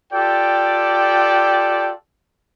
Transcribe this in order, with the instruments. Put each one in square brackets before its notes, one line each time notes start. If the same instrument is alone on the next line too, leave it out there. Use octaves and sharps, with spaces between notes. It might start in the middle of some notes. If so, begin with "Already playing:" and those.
[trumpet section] F4 G4 A4 D5 G5